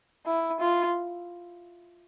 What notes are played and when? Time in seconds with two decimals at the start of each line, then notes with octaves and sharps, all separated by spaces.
0.26 E4
0.60 F4